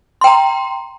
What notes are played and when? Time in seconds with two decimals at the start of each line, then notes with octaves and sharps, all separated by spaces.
0.21 C6
0.24 G5
0.27 A#5